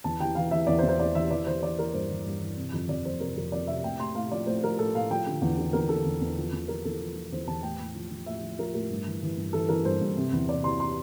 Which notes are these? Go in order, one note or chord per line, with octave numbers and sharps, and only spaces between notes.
E2 A5
E3 G5
E3 F5
E3 E5
E2 D5
C5
E2
C5
E2 D5
E3 E5
E3 D5
E3 C5
E3 D5
E3 A#4
G2 C5
E3
G2
E3
C3
F2
F2 D5
F2 C5
C3 A#4
F2 A#4
F2 D5
C3 E5
A2 G5
A2 C6
A2 F5
F3 D5
A2 C5
F3 A#4
A2 A4
A2 F5
F3 G5
D3
E2
D3
E2 A#4
D3 A4
E2
E2
F3
E2
F3 A#4
E2 A4
F3
F3
E2 C5
E2 A5
A2 G5
A2
F3
F3
A2 E5
F3
F3 A#4
A2 A#4
G2
E3
E3
G2
E3 A4
E3 A#4
G2 C5
G2
C3
E2
C3 D5
E3 C6
C6